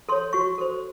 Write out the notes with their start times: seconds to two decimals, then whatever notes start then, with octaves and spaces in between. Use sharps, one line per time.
0.09 A4 C#5 C6
0.33 F#4 C#6
0.58 A4 C5